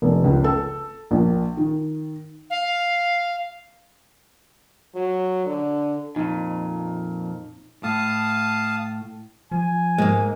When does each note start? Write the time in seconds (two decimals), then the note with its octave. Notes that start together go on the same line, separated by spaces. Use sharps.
0.02 F1
0.24 C#2
0.44 A4
1.11 A#1
1.57 D#3
2.50 F5
4.95 F#3
5.46 D3
6.16 F2 A#2 D#4
7.83 A2 F5 A5 D#6
9.51 F3 G#5
9.98 G#2 G#3 A#3